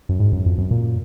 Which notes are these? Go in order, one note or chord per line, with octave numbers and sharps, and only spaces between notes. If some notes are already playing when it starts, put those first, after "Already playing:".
F#2
G#2
F#2
F2
F#2
A#2